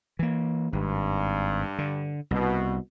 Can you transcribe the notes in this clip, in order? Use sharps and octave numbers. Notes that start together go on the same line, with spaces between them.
E3 A#3
G#1 G2
D3
C2 B2